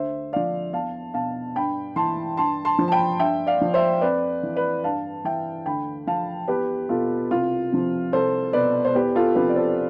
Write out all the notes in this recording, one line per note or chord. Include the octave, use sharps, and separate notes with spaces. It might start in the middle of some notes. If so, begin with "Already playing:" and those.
Already playing: D2 C5 E5
D3 F3 D5 F5
E2 F5 A5
B2 F5 A5
G2 G5 B5
E3 A5 C6
G2 A5 C6
A5 C6
F3
A5
G5 B5
G2 E5 G5
D5 F5
F3
C5 E5
F2 B4 D5
E3
B4 D5
G2 F5 A5
E3 E5 G5
D2 G5 B5
D3 F3 F5 A5
E2 G4 B4
B2 F4 A4
C2 F4
C3 F3
C2 A4 C5
B2 B4 D5
C5
E2 G4 B4
F4 A4
C3 F3 G4 B4
D5
A4 C5